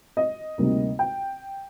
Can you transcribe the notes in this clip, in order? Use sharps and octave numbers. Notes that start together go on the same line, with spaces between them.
D#5
D2 C3 G3 A#3 D#4
G5